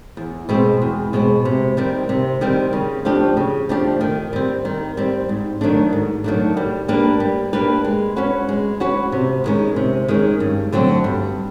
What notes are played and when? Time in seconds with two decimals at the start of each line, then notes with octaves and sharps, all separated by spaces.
0.17 E2
0.49 B2 G#3 C4
0.82 E2
1.13 B2 G#3 C4
1.45 C3
1.77 D#3 G3 C4
2.09 C3
2.41 D#3 G3 C4
2.73 C#3
3.05 F3 A3 D4 G4
3.37 C#3
3.69 F3 A3 D4 G4
4.01 D#3
4.33 G3 C4
4.65 D#3
4.97 G3 C4
5.29 G#2
5.61 D#3 F#3 A3 D4
5.93 G#2
6.24 D#3 F#3 A3 D4
6.57 G3
6.88 A#3 D4 G4 B4
7.20 G3
7.53 A#3 D4 G4 B4
7.84 G#3
8.16 C#4 F#4 B4
8.49 G#3
8.80 C#4 F#4 B4
9.12 C3
9.44 D#3 G#3 C#4
9.76 C3
10.08 D#3 G#3 C#4
10.40 G2
10.72 D3 F#3 A3 C4
11.04 G2